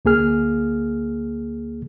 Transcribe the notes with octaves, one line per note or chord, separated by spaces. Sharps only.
D2 A#3 G#4 F6